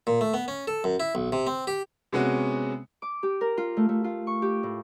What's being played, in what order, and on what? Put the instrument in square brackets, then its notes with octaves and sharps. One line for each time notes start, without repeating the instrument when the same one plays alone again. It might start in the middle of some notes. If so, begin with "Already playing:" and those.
[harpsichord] A#2
A3
B3
C#4
A4
F#2
E4
B1
C3
C4
G4
[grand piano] C3 G#3 B3 C#4 F#4
[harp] D6
G4
A#4
F4
A3
A3
F4
C#6
G4
A2